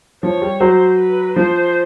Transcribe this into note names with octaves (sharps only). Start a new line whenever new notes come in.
F3 C#5
G3
F#3 C5
B4
F3 C5